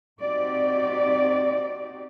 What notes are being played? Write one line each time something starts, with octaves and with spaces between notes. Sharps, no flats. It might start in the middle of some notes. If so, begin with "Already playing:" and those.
C4 D#4 F#4 G4 D5